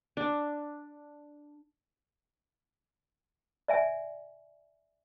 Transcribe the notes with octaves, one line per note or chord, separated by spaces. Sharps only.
D4
D5 E5 G#5